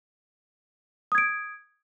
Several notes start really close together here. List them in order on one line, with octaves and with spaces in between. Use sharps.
D#6 G#6 D7